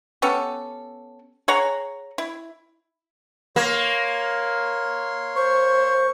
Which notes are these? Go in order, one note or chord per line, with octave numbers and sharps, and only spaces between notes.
B3 C#4 G4 A4
G#4 C#5 F#5 A#5
E4
A#3 C#5 C6
C5 C#6